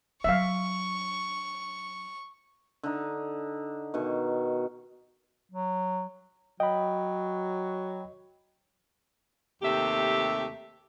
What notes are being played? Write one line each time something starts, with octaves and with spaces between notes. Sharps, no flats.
F#3 D4 E5 F5 C#6
D3 D#4
B2 D#3
F#3
F#3 D#5 G5 B5
D#2 C3 A3 G4 E5